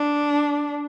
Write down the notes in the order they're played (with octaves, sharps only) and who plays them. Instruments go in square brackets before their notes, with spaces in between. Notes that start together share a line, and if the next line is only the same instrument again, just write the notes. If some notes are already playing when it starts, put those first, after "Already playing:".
Already playing: [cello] D4